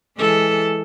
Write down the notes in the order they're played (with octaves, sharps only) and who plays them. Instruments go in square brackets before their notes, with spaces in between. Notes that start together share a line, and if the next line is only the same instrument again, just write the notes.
[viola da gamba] E3 G#3 A4